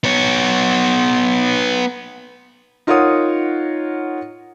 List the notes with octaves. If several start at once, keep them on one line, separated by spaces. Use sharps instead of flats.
B3 C#5
D#4 F4 A#4 C#5 F#5 D#6